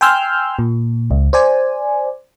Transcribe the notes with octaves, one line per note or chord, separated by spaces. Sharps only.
G5 G#5 C6 E6 F6 G6
A#2
C#2
C5 D5 G#5